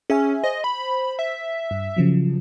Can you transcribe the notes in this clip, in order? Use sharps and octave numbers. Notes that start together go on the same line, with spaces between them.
C#4 G#4 E5 G#5
C5 D#5
B5
E5
G2
C#3 F3 F#3